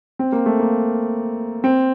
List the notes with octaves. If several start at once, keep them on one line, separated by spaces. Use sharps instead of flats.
C4
A#3
A3
A#3
C4